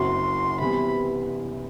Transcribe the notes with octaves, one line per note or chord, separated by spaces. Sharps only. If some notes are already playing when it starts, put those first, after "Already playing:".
Already playing: F#1 F#2 F#3 C4 F#4 C6
C2 C3 E3 B3 B5